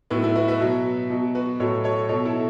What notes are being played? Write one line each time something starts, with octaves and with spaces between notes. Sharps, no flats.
A2 F#3 B3 E4
B3 E4
F#4 B4
B4 E5
B2 F#3
B2 F#3
F#4 B4
A2 F#3 A4 C#5
A4 C#5
B2 F#3 A4 C#5
E4 A4